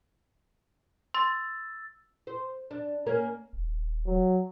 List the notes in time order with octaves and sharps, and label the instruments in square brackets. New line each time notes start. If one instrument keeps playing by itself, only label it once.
[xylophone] C6 [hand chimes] E6 A6
[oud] C5
D4
A#3 C#4 A#4
[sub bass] D#1
[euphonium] F#3